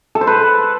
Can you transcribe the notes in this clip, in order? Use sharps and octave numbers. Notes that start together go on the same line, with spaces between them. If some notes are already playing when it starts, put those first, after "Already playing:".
A4
C5
B4